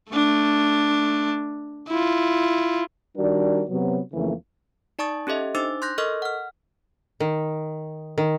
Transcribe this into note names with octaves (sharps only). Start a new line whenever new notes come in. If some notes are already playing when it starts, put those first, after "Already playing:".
A3 D4
E4 F4
D#3 G3 D4 F#4 A#4 D5
C3 F#3 B3
F2 C#3 E3 F3 A3 A#3
D#4 D5 A5 C#6 D#6 A6
C#4 G4 A4 D#5 E5
D4 D#4 C5 D6 E6 A6
C6 F#6 G6 A#6
A4 A#4 D#5 C#6 F6
F#5 F6
D#3
D#3